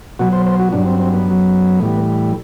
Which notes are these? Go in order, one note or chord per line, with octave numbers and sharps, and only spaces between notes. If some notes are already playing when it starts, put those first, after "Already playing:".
B2 F#3 F#4
C5
C5
F#4
G2 F#3 D4
C4
C4
B3
F#2 F#3
A2 E3 G3